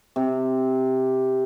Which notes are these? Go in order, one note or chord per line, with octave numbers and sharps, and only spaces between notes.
C3